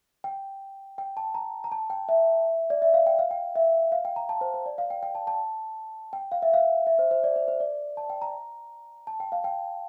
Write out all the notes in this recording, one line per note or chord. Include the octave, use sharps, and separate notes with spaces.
G5
G5
A5
A#5
A#5
A5
G5
E5
D5
E5
F5
G5
F5
G5
E5
F5
G5
A#5
A5
C5
C5
D5
F5
G5
G5
A5
A5
G5
F5
E5
F5
E5
C5
C5
D5
C5
C5
D5
A5
G5
A#5
A5
G5
F5
G5